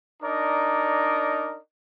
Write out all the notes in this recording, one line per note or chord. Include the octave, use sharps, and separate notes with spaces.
D4 D#4 A#4 D5 D#5